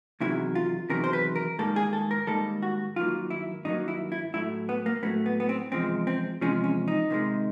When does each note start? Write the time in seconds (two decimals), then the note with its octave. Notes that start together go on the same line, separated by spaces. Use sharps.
0.20 E2 C3 D#3 F#3 E4
0.55 F4
0.90 E2 C3 D#3 F#3 A#4
1.04 C5
1.13 B4
1.36 A#4
1.59 G#2 D#3 G3 A#3 A4
1.76 G#4
1.93 A4
2.11 A#4
2.27 G#2 D#3 G3 A#3 A4
2.62 F#4
2.96 G2 D#3 F#3 A#3 F4
3.30 E4
3.65 G2 D#3 F#3 A#3 D#4
3.88 E4
4.12 E4
4.34 A2 F#3 A3 E4
4.69 B3
4.86 A#3
5.03 A2 F#3 A3 B3
5.26 B3
5.40 B3
5.49 C4
5.72 E2 C3 F3 G#3 C4
6.07 C4
6.41 E2 C3 F3 G#3 C#4
6.64 C#4
6.88 D#4
7.10 C3 D#3 G#3